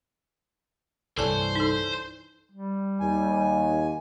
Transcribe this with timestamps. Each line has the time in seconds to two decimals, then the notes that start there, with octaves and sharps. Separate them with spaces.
1.18 C2 G2 E3 D4 A4 C5 C#5 G#5
1.56 D#4 A4
2.52 G3
3.00 D#2 G#5